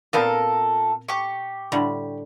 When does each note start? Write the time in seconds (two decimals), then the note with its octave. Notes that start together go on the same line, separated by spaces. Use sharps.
0.13 A#2 B3 C4 F4 A4 A#4
1.09 G4 C#6
1.72 A2 D3 G3